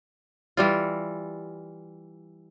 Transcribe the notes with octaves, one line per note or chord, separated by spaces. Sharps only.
E3 G3 F4